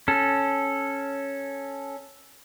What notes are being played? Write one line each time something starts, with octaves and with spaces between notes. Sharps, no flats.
C#4 A4